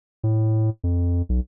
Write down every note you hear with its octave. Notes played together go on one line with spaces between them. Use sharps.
A2
F2
B1